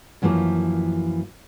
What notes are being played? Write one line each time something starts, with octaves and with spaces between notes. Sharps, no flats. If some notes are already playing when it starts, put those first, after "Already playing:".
F#2 E3 F3 A3 A#3